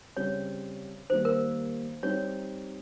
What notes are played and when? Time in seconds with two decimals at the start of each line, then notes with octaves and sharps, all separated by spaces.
0.17 C#3 G3 C4 C#5
1.10 D#3 G3 A#3 C5
1.25 A#4
2.03 G3 C4 D#4 C#5